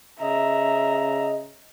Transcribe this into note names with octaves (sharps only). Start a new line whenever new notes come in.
C#3 D#5 E5 A#5